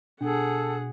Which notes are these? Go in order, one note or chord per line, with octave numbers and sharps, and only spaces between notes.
B2 D4 G#4 A4 F#5